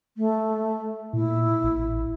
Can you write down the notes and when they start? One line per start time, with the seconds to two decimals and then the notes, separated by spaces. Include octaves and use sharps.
0.17 A3
1.13 A#2 E4
1.63 A1